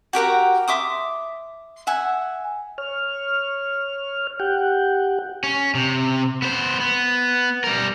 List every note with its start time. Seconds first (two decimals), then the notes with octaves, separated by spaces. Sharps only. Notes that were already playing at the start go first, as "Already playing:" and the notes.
0.13 F#4 G4 A#4 F#5
0.68 E5 C6 D6 D#6
1.87 E5 F#5 G#5
2.78 C#5 F6
4.40 G4 F#5 G5
5.43 C#4
5.75 C3
6.42 B3 C5
6.80 B3
7.64 G3 A#4